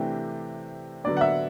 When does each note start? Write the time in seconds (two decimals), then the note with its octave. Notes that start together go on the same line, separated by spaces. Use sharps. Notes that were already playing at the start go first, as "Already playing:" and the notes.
Already playing: C3 E3 A3 D4 G4
1.04 D3 F#3 B3 D4 D5
1.17 F#5
1.21 E5